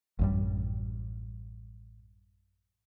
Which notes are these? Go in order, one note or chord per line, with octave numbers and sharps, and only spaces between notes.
A1 F#2 G3